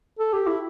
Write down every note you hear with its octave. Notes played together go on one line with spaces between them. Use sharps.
A4
G4
E4